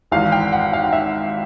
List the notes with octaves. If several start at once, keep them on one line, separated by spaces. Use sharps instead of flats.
G#1 G#2 E3 F5
G5
F#5
F5
E5